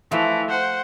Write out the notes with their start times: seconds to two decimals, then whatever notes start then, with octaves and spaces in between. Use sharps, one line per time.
0.11 E3 F3 A3
0.49 C5 F#5